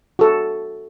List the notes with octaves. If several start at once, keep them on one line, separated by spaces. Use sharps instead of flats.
F#4 A4